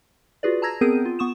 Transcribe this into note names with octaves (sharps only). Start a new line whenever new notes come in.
F4 F#4 G#4 B4 D5
A5 A#5 E6 G#6 A#6
B3 C4 G#4 A#4 G6 D#7
F4
B3 C#6 D#6 E7